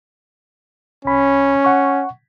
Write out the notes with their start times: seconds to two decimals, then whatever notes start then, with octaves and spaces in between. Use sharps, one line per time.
1.05 C2 C#4 B5
1.65 F#5 C#6